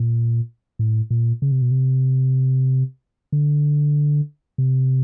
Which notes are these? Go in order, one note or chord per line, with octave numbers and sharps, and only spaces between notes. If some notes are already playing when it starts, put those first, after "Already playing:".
Already playing: A#2
A2
A#2
C#3
C3
B2
C3
D3
C3